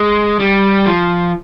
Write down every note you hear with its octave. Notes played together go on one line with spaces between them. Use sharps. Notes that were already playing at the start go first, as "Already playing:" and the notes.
Already playing: G#3
G3
F3